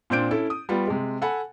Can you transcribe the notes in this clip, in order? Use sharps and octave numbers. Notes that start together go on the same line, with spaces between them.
A#2 C4 D4 G6 D7
C#4 E4 A4
D#6
G3 B3 F4
C3 G#3
A4 F#5 G#5 B5